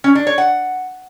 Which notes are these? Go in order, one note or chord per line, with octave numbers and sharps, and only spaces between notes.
C#4
D4
C#5
F#5